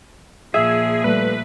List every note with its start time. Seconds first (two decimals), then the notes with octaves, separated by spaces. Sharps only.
0.54 A#2 F3 G#4 E5
1.04 G3 A3 B4